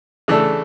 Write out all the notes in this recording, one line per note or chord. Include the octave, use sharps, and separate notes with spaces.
C#3 E3 A3 D4 A4